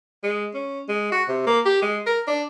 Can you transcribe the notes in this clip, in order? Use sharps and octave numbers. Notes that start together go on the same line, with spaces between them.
G#3
C#4
G#3
F#4
C3
A#3
G4
G#3
A#4
D4